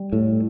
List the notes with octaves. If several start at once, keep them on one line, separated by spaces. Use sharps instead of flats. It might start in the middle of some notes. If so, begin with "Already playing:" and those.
Already playing: G3
A2